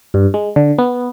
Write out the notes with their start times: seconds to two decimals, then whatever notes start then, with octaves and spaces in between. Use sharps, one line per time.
0.14 G2
0.34 G#3
0.56 D3
0.78 B3